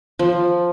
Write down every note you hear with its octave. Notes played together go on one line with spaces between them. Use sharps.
F3